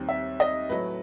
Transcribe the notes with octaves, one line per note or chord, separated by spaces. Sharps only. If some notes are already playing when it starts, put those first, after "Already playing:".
Already playing: D#2 D#3 G3 C4
E5
D#5
A2 F#3 A3 B4